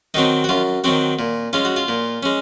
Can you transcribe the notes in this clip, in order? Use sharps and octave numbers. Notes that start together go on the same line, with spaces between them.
D#3 F#3 C4 D#4
F#4
F#2 F4
D#3 F#3 C4 F#4
A#2
G#3 C#4 F4
F#4
F4
A#2
G#3 C#4